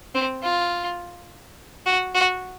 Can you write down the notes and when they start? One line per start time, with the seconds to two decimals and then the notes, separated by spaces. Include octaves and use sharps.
0.15 C4
0.43 F4
1.86 F#4
2.15 F#4